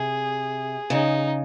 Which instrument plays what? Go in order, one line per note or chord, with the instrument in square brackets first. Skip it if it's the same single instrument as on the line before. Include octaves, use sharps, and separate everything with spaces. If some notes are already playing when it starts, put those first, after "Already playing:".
Already playing: [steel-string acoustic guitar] C3 [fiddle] G#4
[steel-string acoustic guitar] C#3 [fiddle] D#4